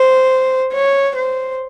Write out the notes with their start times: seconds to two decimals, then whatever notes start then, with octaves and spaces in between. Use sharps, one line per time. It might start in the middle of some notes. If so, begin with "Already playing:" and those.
Already playing: C5
0.73 C#5
1.15 C5